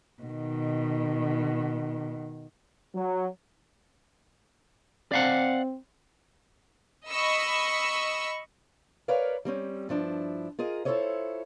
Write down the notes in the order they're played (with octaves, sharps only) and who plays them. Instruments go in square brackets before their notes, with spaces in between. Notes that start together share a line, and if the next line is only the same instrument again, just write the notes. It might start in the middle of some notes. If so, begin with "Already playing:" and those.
[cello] B2 D#3
[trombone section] F#3
[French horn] C4 [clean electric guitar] D5 F5 F#5
[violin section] D#5 B5 C#6 E6
[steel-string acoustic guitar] A#4 B4 C#5 D5 F5
G3 C4 C#4
G2 F3 D4 E4
F4 G#4 A#4 D#5
E4 F4 A4 C5 C#5 D#5